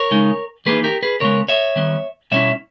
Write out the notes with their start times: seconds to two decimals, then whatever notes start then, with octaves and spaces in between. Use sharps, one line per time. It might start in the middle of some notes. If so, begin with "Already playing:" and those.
Already playing: A#4 C#5
0.11 C#3 G#3 D#4
0.66 E3 A#3 D#4 G#4 B4
0.84 G4 A#4
1.03 G#4 B4
1.20 C#3 E3 G#3 B3 A#4 C#5
1.48 C#5 E5
1.76 D#3 G3 B3
2.31 B2 G3 C#4 E4 C#5 E5